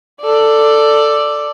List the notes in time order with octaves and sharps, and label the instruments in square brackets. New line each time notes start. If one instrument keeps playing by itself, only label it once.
[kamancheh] A4 D5